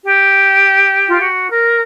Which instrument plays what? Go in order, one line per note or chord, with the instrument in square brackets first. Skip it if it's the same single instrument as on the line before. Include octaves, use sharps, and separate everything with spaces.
[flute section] G4
F4
F#4
A#4